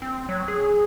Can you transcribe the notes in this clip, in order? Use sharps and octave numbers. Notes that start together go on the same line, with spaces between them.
C4
F#3
G#4